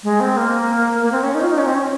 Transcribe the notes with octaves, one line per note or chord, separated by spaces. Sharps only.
G#3
C4
A#3
A#3
C4
C#4
D#4
F4
D#4
C#4
C4
C#4